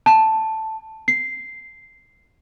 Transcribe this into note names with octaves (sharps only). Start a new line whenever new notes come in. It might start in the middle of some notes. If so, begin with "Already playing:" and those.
A5
C7